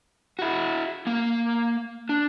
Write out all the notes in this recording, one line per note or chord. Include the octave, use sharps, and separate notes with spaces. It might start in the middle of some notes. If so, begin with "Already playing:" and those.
E4 F#4
A#3 F5
D4